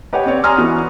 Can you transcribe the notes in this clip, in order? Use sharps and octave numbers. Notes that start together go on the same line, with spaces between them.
G4 B4 C#5 D#5 F#5 G5
C4 G4 C#5 D5
G#5 A#5 C6 D#6 F6
E3 B3 F#4